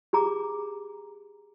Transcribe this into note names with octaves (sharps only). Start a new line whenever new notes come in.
G4 G#4 A#5 D6